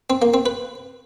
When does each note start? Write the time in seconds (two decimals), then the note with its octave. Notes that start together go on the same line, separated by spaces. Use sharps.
0.10 C4
0.22 A#3
0.34 C4
0.46 B4